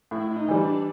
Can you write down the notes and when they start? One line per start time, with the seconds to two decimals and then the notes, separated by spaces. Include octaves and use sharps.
0.11 A2 E4
0.32 E4
0.36 D#4
0.48 E3 G3
0.61 D4